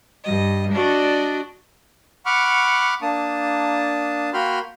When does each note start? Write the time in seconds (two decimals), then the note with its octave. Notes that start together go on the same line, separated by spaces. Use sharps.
0.23 G2 D#5
0.73 D4 F#4 D5 D#5
2.26 F#5 B5 C#6 D6 F6
3.02 A#3 D4 A5 D#6
4.33 A#3 F#4 G5 B5 C6 F6